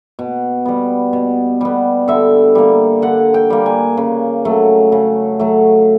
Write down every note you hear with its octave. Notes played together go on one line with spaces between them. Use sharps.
B2
G3 B3
B2
G3 B3
D3 E5
G3 A#3
D3 F#5
G5
G3 A#3
G#5
C#3
F#3 A3
C#3
F#3 A3